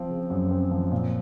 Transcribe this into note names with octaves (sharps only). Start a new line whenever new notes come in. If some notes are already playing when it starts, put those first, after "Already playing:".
Already playing: F3 C4
C#3
F#2
C4
F3
A#2